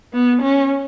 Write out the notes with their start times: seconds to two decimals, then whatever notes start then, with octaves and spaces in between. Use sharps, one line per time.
0.13 B3
0.42 C#4